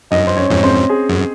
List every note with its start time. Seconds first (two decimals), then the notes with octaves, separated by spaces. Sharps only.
0.11 F#2 D#4 D#5
0.27 C5
0.37 C#4 C#5
0.50 F2 G#2
0.63 C4 C5
0.89 G#4
1.09 F#2